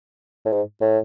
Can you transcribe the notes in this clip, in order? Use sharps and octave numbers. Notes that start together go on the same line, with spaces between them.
A2
G#2
A2